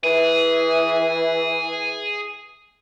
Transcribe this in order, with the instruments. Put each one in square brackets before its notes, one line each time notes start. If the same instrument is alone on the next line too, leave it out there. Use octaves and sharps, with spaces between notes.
[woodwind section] E3 [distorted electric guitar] G#4